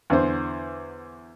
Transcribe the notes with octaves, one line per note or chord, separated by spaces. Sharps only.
E2 D3 C5